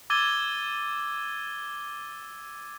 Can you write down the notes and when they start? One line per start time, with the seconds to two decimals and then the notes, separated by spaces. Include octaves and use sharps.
0.10 D6 E6 G#6 A6 D#7 G7